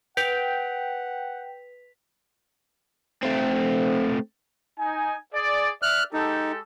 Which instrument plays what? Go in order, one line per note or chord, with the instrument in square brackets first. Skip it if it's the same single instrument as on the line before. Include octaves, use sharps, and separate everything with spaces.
[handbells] B4 [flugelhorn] F#5 [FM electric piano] G5 [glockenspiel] B6 F7
[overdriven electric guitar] A3 C4
[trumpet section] D#4 G#5
G#4 D5
[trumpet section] D5 E5 [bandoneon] F6 F#6
[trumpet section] G#3 G4 A4 [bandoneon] D#4